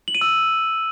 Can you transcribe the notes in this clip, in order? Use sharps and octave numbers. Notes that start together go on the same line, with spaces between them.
F#7
D#7
E6